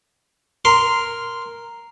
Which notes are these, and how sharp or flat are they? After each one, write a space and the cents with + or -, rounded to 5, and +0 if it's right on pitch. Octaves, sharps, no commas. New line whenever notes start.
A#4 +0 C6 -10